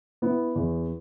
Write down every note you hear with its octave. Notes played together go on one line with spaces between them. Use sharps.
B3 E4
E2